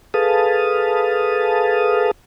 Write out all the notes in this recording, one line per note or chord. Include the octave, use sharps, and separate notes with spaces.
G#4 A4 B4 F5 A5 D#6